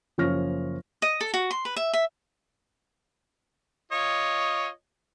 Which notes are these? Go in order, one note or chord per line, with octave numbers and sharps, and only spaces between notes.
F#1 F3 C#4 C#6 F6 A#6
D#5
A4
F#4
C6
B4
E5
E5
F4 C#5 D#5